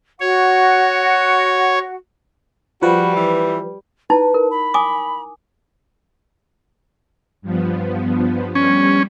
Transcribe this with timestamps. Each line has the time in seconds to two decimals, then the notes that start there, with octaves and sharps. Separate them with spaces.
0.20 F#4 C#5 F#5
2.82 F3 G3 F#4 B4
3.16 E3
4.10 D#4 E4 B4 A5
4.34 A#4
4.51 B5
4.74 G#5 D6 D#6
7.42 G2 F3 B3
8.55 G3 C#4